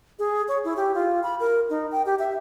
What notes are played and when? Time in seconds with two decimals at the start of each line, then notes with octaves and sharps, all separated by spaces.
0.19 G#4
0.48 C#5
0.64 E4
0.77 G4
0.94 F4
1.23 B5
1.40 A#4
1.70 D#4
1.92 G5
2.06 G4
2.19 E5